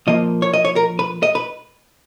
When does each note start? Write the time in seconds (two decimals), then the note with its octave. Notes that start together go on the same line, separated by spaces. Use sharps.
0.07 A#2 F3 A#3 D#5
0.42 C#5
0.53 D#5
0.65 C#5
0.76 A#4
0.99 B4
1.23 D#5
1.35 B4